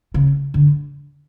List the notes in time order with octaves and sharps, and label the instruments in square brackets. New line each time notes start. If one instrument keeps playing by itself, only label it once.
[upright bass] C#3
D3